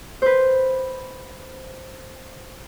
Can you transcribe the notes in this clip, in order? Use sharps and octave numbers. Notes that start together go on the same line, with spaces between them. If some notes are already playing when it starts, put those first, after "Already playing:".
B4 C5